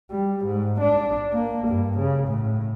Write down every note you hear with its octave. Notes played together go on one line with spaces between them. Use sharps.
G3
G#2
D4
A#3
G2
C#3
A2